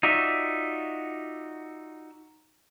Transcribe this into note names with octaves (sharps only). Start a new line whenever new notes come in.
D#4 F4 F#4 D5 E5